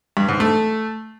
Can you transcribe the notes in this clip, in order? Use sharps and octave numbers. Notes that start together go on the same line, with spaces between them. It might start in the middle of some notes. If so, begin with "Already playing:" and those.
G2
G#2
A3